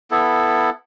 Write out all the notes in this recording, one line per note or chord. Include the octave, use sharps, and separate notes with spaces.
B3 E4 A4